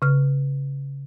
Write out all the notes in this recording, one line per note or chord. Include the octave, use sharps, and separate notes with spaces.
C#3 F6